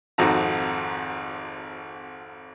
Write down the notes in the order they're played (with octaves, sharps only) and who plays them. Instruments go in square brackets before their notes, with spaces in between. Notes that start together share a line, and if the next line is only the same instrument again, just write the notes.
[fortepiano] G#1 F2 F#4 A#5